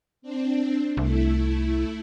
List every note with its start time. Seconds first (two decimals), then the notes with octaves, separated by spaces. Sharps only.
0.22 C4 D4
0.97 C2 A3 E4